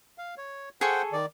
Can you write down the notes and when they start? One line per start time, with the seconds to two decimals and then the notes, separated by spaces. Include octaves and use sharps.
0.18 F5
0.38 C#5
0.81 G#4 A4 C5 F#5 G5 C#6
1.12 D#3 D5